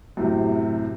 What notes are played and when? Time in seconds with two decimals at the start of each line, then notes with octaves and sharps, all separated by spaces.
0.17 F#2 A2 C3